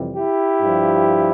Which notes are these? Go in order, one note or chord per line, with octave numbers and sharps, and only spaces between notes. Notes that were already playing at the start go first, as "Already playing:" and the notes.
Already playing: F2 C3 E3 G3
E4 G4
G2 F3